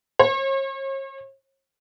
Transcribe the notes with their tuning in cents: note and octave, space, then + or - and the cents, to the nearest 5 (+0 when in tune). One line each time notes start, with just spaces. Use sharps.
C#5 -45